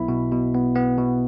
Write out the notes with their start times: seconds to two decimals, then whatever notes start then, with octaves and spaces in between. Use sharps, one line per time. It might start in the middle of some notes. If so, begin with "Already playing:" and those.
Already playing: B1 B3 E4 B5
0.08 B2
0.32 B2
0.54 B3
0.76 B3
0.98 B2